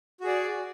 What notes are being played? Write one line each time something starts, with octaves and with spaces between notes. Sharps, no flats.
F#4 G#4 D5